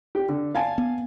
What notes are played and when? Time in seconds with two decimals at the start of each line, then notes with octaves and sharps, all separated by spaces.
0.15 G4
0.29 D3
0.55 F5 G#5 A5
0.78 B3